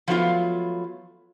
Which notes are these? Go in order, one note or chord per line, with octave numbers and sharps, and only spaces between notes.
F3 F#3 A3 B3 D#4 F4